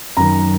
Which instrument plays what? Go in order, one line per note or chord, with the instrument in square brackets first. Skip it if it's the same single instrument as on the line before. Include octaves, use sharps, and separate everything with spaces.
[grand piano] F#2 D#3 A#5